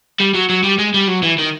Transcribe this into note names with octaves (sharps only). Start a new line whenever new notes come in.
G3
F#3
F#3
G3
G#3
G3
F#3
E3
D#3